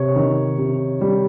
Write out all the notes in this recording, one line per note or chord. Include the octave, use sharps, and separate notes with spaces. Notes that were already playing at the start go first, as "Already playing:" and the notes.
Already playing: C3 C#5
D#3
C3
G3